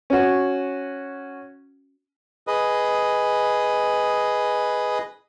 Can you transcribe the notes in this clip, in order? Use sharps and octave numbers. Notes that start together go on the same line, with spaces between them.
C#4 F#4
G#4 B4 D#5 D#6